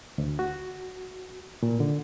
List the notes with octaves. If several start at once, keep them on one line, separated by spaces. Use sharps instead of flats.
D2
F#4
A#2
D3